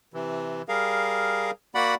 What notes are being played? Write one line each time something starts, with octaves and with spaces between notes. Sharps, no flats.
C3 E3
G3 G#4 A#4 F5
A#3 F#4 D5 F#5 B5